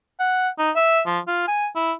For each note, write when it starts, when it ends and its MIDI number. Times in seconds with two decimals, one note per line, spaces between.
0.20 0.49 78
0.58 0.71 63
0.76 1.01 76
1.06 1.19 53
1.27 1.45 65
1.48 1.68 80
1.76 1.93 64